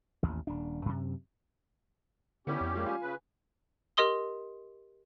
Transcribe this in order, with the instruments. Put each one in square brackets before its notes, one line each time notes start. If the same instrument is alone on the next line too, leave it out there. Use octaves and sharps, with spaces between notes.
[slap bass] A1 D#2
D#1 D4
F#2 C3
[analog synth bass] D3 [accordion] G3 C#4 G4 [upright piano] B3 E4 B4
[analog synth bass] F2
[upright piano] F3 G#3 A#3
[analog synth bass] F4 [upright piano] F5 G#5
[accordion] C#3 B4
[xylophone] G4 A#4 D#5 C6 D#6 G7